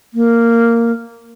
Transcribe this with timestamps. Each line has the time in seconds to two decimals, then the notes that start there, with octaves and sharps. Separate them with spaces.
0.14 A#3